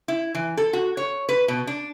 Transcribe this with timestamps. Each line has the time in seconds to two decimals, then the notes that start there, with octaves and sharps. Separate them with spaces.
0.08 E4
0.35 E3
0.57 A4
0.73 F#4
0.97 C#5
1.29 B4
1.48 B2
1.67 D4